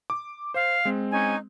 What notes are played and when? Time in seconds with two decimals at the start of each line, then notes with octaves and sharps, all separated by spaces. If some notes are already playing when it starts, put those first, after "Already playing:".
0.10 D6
0.54 C5 F5
0.85 G#3 C4
1.11 C#4 D#4 G#5